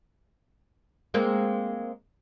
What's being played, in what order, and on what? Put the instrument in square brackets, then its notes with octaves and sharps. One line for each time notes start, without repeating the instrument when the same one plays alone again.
[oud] G#3 A#3 C4